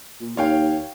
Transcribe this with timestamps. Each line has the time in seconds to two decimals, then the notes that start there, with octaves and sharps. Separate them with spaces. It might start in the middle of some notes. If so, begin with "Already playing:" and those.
0.21 A#2
0.37 D#2 C#5 F5 G5